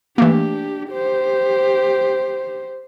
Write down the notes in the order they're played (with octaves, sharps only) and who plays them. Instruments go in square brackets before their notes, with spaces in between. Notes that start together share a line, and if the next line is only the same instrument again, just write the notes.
[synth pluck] E3 A3 A#3 [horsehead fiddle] D4 G4
[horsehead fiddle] G4 C5